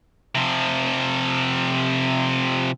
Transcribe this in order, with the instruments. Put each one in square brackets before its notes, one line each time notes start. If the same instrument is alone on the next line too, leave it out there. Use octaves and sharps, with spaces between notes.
[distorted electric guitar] C3 F3